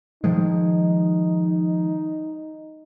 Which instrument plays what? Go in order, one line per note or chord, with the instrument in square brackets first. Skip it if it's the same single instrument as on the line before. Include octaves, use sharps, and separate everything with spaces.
[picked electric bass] D#3 F3 G#3 [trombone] D#4